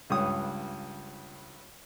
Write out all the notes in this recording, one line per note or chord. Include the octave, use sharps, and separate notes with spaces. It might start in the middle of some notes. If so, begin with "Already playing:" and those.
C#2 G2 C#5 D#6